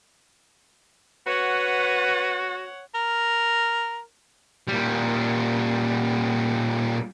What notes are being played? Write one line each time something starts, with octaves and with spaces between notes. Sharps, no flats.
F#4 B4 C#5 F#5
A#4
A#2 G3